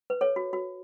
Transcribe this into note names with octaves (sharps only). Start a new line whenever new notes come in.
B4
A4 C#5
F#4
F#4